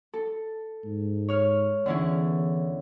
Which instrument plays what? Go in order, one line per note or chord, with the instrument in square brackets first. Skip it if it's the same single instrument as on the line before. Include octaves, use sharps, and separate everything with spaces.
[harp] A4
[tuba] G#2
[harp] C#5 F6
[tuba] E2 [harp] D3 C#4 E4